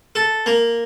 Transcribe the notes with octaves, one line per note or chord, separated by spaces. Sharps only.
A4
A#3